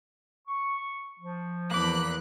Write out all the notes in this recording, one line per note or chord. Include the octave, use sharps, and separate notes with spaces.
C#6
F3
E2 A#3 B5 D6 F#6